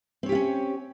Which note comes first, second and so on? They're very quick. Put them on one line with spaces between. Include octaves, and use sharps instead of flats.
C4 C#5 G4 F4 C#4